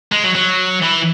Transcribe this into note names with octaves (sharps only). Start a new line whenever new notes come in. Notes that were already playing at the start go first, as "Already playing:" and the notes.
G#3
F#3
F#3
E3